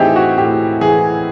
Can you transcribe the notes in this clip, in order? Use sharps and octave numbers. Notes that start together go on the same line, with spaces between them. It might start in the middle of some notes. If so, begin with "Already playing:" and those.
Already playing: A2 E3 C4 D#4 E4 G4 G#4
F#4
A2 G4
E3 G#4